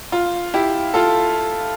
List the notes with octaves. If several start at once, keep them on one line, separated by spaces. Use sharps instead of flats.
F4
E4 G4
F4 A4